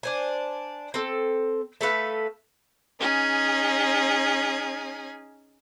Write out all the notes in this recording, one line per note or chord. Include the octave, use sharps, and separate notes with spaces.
D4 C5 G#5
C4 A4
A3 A4 B4 F5
C#4 D#4 G#4